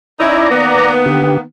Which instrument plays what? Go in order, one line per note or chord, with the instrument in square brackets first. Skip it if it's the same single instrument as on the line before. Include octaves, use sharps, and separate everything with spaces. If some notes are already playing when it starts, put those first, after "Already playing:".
[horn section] C#4 D#4 E4 [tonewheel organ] D5 A#5
[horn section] D#3 A#3 B3
[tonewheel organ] D3 G4